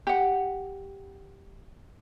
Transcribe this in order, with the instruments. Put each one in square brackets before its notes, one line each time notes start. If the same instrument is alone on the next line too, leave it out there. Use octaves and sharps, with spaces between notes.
[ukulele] G4 F#5